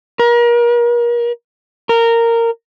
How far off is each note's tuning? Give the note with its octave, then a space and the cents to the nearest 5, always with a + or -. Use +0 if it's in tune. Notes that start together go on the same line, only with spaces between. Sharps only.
A#4 +35
A#4 -15